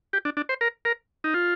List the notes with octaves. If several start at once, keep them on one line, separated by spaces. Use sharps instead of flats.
G4
D4
D4
C5
A#4
A#4
D#4
F4